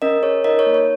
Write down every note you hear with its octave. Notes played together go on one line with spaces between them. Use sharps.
C#4 A#4 D#5
G#4 C#5
D#4 A#4 D#5
C#5
A#3
C#5